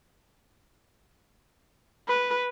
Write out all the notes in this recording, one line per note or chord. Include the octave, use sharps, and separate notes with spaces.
B4